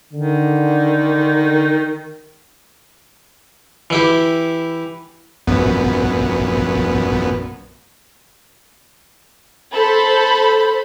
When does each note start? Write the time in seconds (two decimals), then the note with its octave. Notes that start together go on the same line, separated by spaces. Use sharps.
0.13 D3 D#3
3.90 E3 E4 G4
5.47 A#1 F#2 B3
9.73 A4 C5 B5